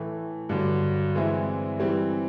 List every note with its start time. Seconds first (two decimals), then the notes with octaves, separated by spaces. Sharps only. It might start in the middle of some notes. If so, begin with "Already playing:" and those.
Already playing: A2 E3 A3
0.49 G2 D3 F#3
1.15 E3 G#3 C4 E4
1.79 E3 G3 C4